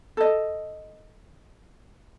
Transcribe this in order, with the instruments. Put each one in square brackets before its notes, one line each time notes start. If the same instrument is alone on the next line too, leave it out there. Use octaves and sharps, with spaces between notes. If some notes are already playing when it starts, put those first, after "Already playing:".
[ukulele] A4 D#5